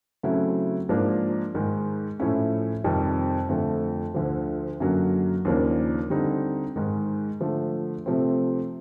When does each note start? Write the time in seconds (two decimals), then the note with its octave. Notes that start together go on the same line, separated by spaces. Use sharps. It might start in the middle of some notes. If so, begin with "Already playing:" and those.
0.23 C#3 F#3 A3 C4 E4
0.89 G#2 F3 A#3 D4
1.55 G#2 D#3 G#3
2.20 A2 F3 A3 C#4 E4
2.84 F2 C3 D#3 G3
3.49 F2 D3 F3 A3
4.14 D2 D3 F3
4.80 F#2 D3 F#3 A#3
5.45 D#2 C#3 F3 A#3 D4
6.10 D3 G3 C4 D#4
6.76 G#2 D#3 G#3
7.41 D3 F3 A3
8.06 C3 F3 A3 C4